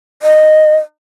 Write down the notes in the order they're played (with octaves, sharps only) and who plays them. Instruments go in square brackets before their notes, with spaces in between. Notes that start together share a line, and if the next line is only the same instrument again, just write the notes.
[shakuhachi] D#5